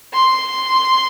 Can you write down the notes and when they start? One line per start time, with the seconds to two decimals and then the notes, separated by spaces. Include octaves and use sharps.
0.13 C6